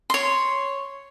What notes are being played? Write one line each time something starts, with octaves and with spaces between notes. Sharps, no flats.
C#5 C6